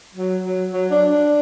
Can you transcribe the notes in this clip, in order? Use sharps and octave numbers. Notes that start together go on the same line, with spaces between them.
F#3
F#3
F#3
D4
D4